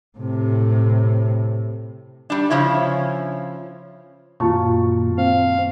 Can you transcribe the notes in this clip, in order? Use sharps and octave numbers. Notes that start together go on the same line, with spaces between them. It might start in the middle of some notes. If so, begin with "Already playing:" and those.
A2 C3
G3 D4
C#3 F3 C#4 E4
F#2 A#2 D#3 A#3 F4 A5 C#6
C4 F5